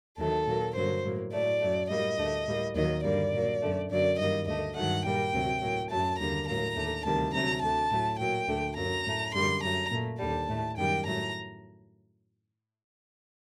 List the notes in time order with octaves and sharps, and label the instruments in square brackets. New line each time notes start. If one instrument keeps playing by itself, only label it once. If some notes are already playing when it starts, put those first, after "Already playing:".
[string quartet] D#2 D#3 F#3 A3 A4
A#2 F#3 A#3
G2 D3 F#3 A#3 C5
A2 F#3 A#3
A2 F#3 A3 D5
F#2 F#3 A3
A2 G3 A#3 D#5
D2 D3 A3
A2 G3 A#3
D#2 D#3 F#3 A#3 D#5
G2 D3 G3 A#3 D5
A#2 F#3 A#3
F#2 D3 A3
F#2 D3 F#3 A#3 D5
G2 D#3 G3 A#3 D#5
D2 D3 A3 D#5
G2 D#3 F#3 A3 F#5
A#2 G3 A#3 G5
D2 C3 F#3 A#3
A2 F#3 A#3
F#2 F#3 A3 A5
D#2 D3 G3 A#3 A#5
A2 F#3 A#3 A#5
D#2 D3 A3
D2 C3 D#3 G3 A#3 A5
D2 C3 F#3 A3 A#5
D2 D3 A3 A5
A2 F#3 A3
A#2 F#3 A#3 G5
D2 D3 A3
F#2 F#3 A#3 A#5
A2 A3
F#2 D3 G3 A#3 C6
F#2 F#3 A3 A#5
A#2 A3
D#2 D3 G3 A5
A2 A3
F#2 D#3 G3 A#3 G5
A2 F#3 A3 A#5